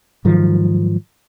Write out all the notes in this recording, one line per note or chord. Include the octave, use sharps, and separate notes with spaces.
G#2 D#3 F3 F#3